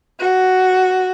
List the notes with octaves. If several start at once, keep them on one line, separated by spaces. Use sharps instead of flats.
F#4